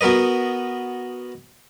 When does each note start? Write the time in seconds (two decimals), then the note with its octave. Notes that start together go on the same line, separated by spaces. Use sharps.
0.01 B3 F#4 A#4 B4 D#5